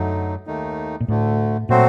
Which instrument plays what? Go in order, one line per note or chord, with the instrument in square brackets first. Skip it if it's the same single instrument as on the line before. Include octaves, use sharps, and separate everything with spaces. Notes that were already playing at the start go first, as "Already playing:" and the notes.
Already playing: [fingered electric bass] F#2 [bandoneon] D3 F#3 A3 D#4
[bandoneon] D#2 D#3 A3 D#4
[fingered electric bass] A#2
[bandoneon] D2 D3 A3 [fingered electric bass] A2
[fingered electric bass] A#2 [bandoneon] F#3 A3 C4 F#4 C5